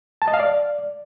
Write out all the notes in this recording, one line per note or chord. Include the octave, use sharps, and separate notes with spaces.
A5
D#5
F5
D5